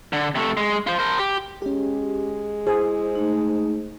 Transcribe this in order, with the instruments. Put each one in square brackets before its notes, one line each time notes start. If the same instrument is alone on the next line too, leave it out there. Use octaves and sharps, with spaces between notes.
[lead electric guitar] D3
C3 A3
G#3
F4 C5
A#4 C5
G4
[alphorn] G#3 [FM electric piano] C#4 G4
[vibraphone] E4 [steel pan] G#4 [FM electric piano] C5
[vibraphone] A3 D#4